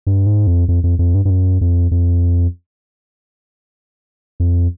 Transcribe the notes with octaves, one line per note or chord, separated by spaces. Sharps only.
G2
G#2
F2
F2
F2
F2
G2
G2
F#2
F2
F2
F2